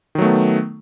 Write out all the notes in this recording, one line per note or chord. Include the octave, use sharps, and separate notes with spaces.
D#3 F#3 A3 B3